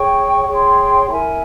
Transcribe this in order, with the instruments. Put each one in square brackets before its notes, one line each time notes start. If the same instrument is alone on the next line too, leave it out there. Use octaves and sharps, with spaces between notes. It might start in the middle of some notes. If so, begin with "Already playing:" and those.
Already playing: [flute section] G#4 C#5 G5 C#6
G#4 C#5 G5 C6
E4 A#4 E5 G#5